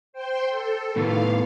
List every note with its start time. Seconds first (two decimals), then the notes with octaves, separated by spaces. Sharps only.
0.13 C5 G5 C6
0.49 A4
0.96 A2 D#3 B3 F5